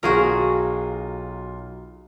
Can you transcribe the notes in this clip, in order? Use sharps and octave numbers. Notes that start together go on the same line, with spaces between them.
B1 F4 F#4 G#4 A#4